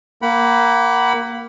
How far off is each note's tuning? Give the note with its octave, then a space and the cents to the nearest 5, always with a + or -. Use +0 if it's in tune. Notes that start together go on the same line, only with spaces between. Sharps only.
A#3 +0 F#5 +35 B5 +0